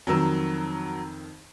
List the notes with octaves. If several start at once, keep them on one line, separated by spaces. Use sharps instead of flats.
F2 D#3 F#3 A#4 E6